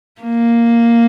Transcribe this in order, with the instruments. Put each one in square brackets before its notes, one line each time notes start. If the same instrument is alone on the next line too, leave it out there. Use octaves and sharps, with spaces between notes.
[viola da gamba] A#3